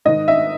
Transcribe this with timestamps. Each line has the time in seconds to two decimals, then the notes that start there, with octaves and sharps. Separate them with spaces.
0.05 G#2 D#3 D#5
0.28 E5